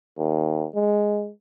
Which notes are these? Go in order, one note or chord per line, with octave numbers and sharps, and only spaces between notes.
D#2
G#3